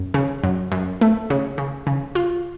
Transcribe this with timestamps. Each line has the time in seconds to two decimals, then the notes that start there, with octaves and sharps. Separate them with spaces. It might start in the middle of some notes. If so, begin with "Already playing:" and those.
Already playing: F#2
0.14 C#3
0.43 F#2
0.72 F#2
1.01 A3
1.30 C#3
1.58 C#3
1.87 C#3
2.15 F4